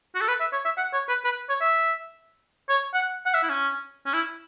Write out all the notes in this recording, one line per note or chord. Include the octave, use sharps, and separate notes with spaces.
F#4
A4
B4
E5
C#5
E5
F#5
C#5
B4
B4
C#5
E5
C#5
F#5
F#5
E5
E4
C#4
C#4
E4